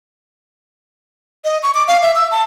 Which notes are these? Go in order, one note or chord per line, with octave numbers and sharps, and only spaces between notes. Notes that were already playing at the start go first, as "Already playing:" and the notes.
D#5
C#6
D6
F5
E5
E6
A5